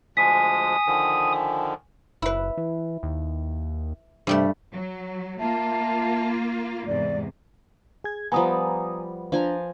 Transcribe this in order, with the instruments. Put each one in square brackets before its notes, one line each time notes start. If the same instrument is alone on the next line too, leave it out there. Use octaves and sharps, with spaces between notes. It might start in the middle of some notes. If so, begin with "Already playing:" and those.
[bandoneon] D2 F3 G#3 [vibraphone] G#5 [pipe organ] D#6 [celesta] B6
[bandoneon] D3 D#3 F3
[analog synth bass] F#1 [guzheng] E4 B4
[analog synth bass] E3
D#2
[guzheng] G2 G3 A3 [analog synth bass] C3
[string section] F#3
[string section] A#3 F4 [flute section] E5 A5
[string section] E2 G#2 C3 [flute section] D5
[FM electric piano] G#4 G#6
[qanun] F3 G3 B3 [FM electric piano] G#5 A#5 D#6
[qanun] F3 G#5 A#5 [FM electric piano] D4